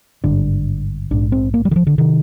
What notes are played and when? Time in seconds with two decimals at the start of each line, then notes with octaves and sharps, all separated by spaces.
0.24 G#1 G2 D3 D4
1.11 A#1 G#2 D4
1.32 C4
1.54 A#3
1.65 G3
1.71 D#3
1.76 F3
1.87 D3
1.98 C3 D#3